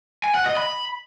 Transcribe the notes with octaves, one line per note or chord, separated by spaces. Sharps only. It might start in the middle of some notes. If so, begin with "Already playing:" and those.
G#5
F#5
D#5
B5